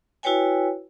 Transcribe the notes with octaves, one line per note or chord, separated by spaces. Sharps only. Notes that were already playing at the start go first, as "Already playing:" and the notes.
E4 F#4 B4 C#5 G5 G#5